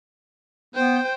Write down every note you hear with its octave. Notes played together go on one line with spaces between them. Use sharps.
B3 C5 G5